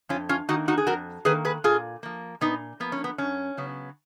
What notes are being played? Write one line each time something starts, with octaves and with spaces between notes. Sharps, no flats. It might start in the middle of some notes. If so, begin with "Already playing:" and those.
F2 C#4 F4
C#4 F4
D#3 A#3 D#4 F#4
D#4 F#4
G#4
F2 F#4 A#4
D#3 A#3 G#4 B4
G#4 B4
A#2 F4 G#4
F3 A#3
A#2 B3 D#4
F3 A#3 B3
C#4
B3
F#2 C#4
C#3 F#3 B3